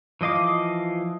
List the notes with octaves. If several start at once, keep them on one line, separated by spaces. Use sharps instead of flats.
E3 F3 D#5 F5 D6